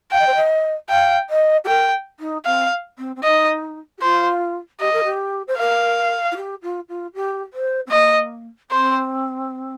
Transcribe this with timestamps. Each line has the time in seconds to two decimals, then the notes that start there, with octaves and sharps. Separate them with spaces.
0.12 F5 G5
0.19 D#5
0.26 C5
0.35 D#5
0.89 F5 G5
1.29 D#5
1.64 G4
1.67 A#4 G5
2.19 D#4
2.45 C4 F5
2.98 C4
3.16 C4
3.23 D#4 D#5
3.98 G4
4.01 F4 C5
4.80 G4 D#5
4.93 A#4
5.04 G4
5.47 C5
5.58 A#4 F5
6.31 F4
6.36 G4
6.62 F4
6.88 F4
7.14 G4
7.53 C5
7.86 C4
7.92 A#3 D#5
8.70 C4 C5